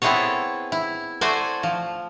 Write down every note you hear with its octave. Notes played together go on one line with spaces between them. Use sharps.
B3 C4 E4 G#4 A4 C#5
E4
A3 F#4 C5 D5 G#5
F3